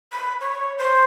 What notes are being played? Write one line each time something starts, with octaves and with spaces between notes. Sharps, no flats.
B5
C#5
C5